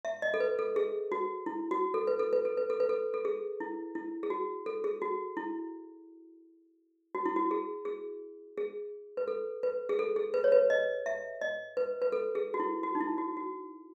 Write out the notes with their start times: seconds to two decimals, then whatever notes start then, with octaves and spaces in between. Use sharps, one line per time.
0.05 E5
0.22 D#5
0.34 A4
0.40 B4
0.59 A4
0.76 G#4
1.12 F#4
1.46 E4
1.71 F#4
1.94 A4
2.07 B4
2.19 A4
2.33 B4
2.45 A4
2.57 B4
2.70 A4
2.80 B4
2.89 A4
3.14 A4
3.25 G#4
3.60 E4
3.95 E4
4.23 G#4
4.30 F#4
4.66 A4
4.84 G#4
5.02 F#4
5.37 E4
7.15 F#4
7.26 E4
7.36 F#4
7.51 G#4
7.85 G#4
8.57 G#4
9.17 B4
9.28 A4
9.63 B4
9.89 G#4
9.99 A4
10.16 G#4
10.34 B4
10.44 C#5
10.52 B4
10.70 D#5
11.06 E5
11.41 D#5
11.77 B4
12.02 B4
12.12 A4
12.35 G#4
12.54 F#4
12.60 E4
12.83 F#4
12.95 D#4
13.01 E4
13.18 F#4
13.37 F#4